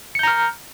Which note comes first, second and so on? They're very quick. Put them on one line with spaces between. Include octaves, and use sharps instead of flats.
C#7 G6 A#5 F6